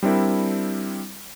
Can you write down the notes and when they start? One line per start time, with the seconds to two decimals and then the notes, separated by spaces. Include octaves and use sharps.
0.03 G3 C4 D4 E4 A#4